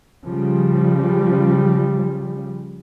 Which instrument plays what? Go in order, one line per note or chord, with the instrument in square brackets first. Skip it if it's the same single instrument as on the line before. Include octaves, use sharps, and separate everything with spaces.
[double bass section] C#3 F3 G3